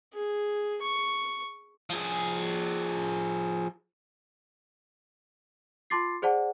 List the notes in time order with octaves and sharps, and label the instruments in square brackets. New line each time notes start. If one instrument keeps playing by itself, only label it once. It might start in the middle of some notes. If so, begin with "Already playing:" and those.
[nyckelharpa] G#4
C#6
[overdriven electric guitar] F3 G#4
[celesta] F4 A5 C6 D6 A6 C7
G#4 C5 D5 F#5 A5